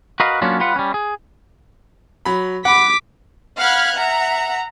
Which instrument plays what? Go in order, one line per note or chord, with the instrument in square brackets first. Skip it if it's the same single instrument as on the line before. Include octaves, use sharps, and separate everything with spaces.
[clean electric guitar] F#4 A#4 B4 D#5 F5
F#3 A#3 B3 C#4 D4 F4
G3 F4 B4 F#5
G3 C#4
G#4
[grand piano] F#3 B5
[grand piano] F#5 B5 [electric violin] D6 B6
[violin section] F5 F#5 B5 F6 F#6 G#6
E5 F#5 A#5